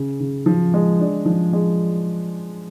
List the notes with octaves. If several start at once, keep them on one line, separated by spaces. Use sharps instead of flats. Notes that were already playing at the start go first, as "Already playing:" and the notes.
Already playing: C#3
C#3
F3
G#3
D4
F3
G#3